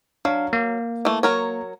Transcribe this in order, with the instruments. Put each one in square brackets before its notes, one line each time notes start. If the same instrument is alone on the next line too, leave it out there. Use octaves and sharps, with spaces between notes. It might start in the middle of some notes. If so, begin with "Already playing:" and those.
[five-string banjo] F#3 [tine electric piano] D4 F5
[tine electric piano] A#3
[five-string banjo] E3 A3
F#3 A#4 C#5